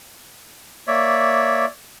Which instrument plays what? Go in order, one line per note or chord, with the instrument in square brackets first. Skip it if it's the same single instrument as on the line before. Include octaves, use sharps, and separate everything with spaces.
[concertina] A#3 C#5 D5 E5